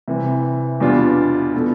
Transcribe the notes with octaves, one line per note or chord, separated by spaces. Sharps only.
C3 E3 G3
E2 B2 G3 D4 F4
B2 A3 E4